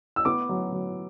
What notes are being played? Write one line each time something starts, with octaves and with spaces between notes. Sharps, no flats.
E6
B3 D6
F#3
F#3